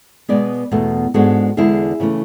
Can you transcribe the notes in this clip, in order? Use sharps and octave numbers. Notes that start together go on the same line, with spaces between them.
B2 G#3 B3 B4 D5
E2 B2 A3
G#2 G#3 B3 D4 F#4 A4
E2 D3 G#3 D4 E4 G#4
C#3 E3 A3 C#4